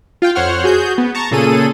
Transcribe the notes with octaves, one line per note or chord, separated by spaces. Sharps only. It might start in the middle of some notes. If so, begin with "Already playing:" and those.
F4 F5 G5
F2 C5 C#5 F#5 F6
F#4 G#4 G6
B3
A5 A#5 C#6
A#2 C#3 G#4 A4 D#7